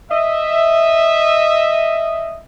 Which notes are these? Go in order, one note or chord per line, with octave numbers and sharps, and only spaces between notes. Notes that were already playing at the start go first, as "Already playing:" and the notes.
D#5 E5